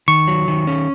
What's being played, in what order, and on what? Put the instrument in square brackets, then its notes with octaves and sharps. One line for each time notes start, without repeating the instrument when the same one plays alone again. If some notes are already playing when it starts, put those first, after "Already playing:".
[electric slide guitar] D#3 [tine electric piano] C#6
[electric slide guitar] F#3
D#3
C#4